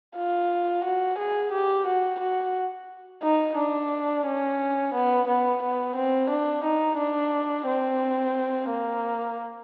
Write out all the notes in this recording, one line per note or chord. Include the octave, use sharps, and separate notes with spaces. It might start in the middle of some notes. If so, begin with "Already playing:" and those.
F4
F#4
G#4
G4
F#4
F#4
D#4
D4
C#4
B3
B3
B3
C4
D4
D#4
D4
C4
A#3